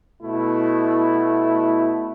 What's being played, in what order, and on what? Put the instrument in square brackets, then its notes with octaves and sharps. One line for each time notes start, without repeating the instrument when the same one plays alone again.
[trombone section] B2 A3 E4